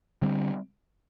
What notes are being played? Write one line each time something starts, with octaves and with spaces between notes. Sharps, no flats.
D3 G3 C4